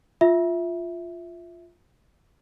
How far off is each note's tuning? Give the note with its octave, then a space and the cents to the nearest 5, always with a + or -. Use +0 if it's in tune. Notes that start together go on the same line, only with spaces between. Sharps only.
F4 +0 E5 -5